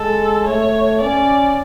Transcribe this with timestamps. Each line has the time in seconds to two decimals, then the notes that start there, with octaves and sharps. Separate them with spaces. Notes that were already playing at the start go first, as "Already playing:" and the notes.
Already playing: G#3 A4
0.47 A3 C#5
1.01 C#4 D5